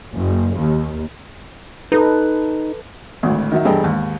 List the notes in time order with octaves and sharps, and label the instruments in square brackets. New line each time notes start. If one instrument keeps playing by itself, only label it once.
[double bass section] F#1
D#2
[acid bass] D#4 [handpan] A4 B4
[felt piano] G#1 D2 A2
D#3 F#3 E5
E1 G2 G#4 A4 D#5 G5
D#2 G#2